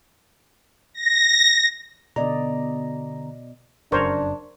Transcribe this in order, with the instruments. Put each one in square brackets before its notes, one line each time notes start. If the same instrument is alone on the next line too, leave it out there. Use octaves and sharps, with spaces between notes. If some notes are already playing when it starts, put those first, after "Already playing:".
[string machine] A#6
[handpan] B2 D5 D#5 [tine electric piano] D3 B3 A#5
[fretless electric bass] F1 F#2 C#3 [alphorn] D4 [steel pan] A#4 C5 C#5